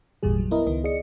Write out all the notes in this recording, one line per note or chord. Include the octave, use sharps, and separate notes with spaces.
G#1 E2 A#2 G3 G#4
F#3
B3 E4 A#4 D#5
C#2 D#3 B3 D#5
G#4 D5 D#5 C#7